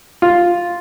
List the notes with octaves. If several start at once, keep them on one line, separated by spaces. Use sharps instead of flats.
F4